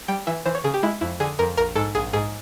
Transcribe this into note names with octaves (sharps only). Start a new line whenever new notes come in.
G3 G5
E3 E5
E3 C5
C#5
C#3 G#4
G4
G#3 E4
F2 E4
D3 G#4
F2 A#4
A#1 A#4
G#2 A4
A#1 G#4
G#2 G#4